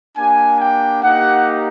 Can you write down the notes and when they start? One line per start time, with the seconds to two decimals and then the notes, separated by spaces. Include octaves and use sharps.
0.17 A#3 D4 G4 G#5
0.60 G5
1.03 A#3 D#4 G4 F#5